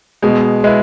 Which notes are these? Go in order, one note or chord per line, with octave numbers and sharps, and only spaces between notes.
B2 G#3
G#3 B3 E4